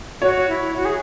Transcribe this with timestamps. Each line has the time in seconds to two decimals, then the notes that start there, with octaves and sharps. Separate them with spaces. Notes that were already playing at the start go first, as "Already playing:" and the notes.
0.21 F#4 C#5
0.49 E4
0.76 F#4
0.85 G#4